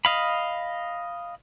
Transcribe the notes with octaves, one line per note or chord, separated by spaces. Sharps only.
D#5 F5 B5